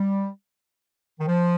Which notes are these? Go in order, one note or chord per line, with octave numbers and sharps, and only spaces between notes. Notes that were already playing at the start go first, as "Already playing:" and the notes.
Already playing: G3
D#3
F3